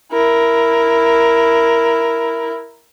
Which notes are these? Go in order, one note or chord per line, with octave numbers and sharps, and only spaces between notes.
E4 A#4